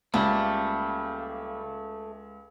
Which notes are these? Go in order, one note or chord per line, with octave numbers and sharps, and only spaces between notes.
C#2 C#3 G3 A3 A#3